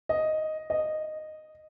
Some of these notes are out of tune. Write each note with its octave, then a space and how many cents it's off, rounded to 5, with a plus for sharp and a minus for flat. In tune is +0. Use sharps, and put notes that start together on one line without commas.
D#5 +0
D#5 -10